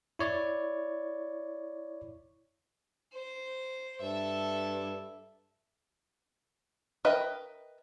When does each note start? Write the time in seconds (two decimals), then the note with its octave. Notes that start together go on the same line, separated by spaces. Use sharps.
0.19 E4 C#5 D5
3.13 C5
4.01 G2 A4 E5
7.05 A#4 B4 D#5 E5 G5